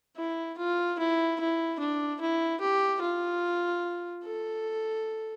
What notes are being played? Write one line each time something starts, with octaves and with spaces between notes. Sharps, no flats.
E4
F4
E4
E4
D4
E4
G4
F4
A4